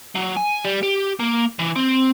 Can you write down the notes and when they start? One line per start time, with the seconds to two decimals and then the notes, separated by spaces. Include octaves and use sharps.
0.15 F#3
0.37 G#5
0.65 G3
0.83 G4
1.20 A#3
1.59 E3
1.76 C4